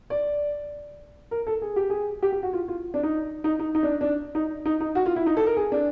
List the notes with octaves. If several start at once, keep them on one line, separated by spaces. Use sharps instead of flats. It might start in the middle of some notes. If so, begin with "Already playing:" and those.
D5
A#4
A4
G#4
G4
G#4
G4
G4
F#4
F4
F4
D4
D#4
D#4
D#4
D#4
D4
D4
D#4
D#4
D#4
F#4
F4
E4
D#4
A4
A#4
G#4
D4